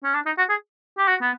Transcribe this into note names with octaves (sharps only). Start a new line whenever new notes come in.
C#4
D4
D#4
F#4
G#4
G4
F#4
B3